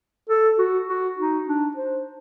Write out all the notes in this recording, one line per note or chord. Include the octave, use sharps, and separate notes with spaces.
A4
F#4
F#4
D#4
D4
C5